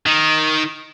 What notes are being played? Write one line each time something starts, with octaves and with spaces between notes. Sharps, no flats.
D#3